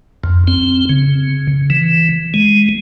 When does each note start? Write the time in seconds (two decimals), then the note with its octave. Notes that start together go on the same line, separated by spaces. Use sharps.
0.24 F2
0.48 C4
0.89 C#3
1.70 E3
2.34 G#3